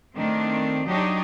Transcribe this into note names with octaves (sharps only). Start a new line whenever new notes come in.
D#3 A3 C4 D4
F#3 D4 D#4 G4 C#5 D#5